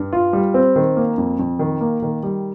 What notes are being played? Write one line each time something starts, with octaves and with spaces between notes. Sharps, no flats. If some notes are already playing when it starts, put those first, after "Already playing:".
Already playing: G2
F4
G3
C4
D#3
A#3
F2
F2
D#3
A#3
D#3
G3